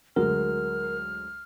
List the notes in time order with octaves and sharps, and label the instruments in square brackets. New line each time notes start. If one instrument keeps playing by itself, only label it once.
[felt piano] D2 F#3 G#3 [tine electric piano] A#4 [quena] F6